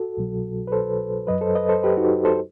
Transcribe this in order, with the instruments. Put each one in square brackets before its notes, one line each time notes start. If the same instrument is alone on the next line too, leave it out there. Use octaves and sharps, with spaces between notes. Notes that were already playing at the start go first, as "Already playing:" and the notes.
Already playing: [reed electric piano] F#4 A4
C2 B2 F#3
B4
A4 C5
F#2 F#3 B4 D#5
A4 C5
B4 D#5
A4 C5
G4 B4
D#4 F#4
A4 C5